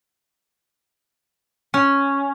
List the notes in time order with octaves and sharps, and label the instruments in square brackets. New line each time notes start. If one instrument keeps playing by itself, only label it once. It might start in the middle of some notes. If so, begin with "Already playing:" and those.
[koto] C#4